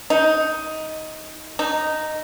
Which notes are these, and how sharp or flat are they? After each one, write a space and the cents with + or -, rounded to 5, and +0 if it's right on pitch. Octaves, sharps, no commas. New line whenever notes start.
D#4 +10
D#4 -5